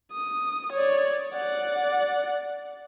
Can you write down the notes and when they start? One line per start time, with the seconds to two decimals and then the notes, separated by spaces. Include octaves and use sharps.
0.13 D#6
0.72 C#5 D5
1.33 D5 F#5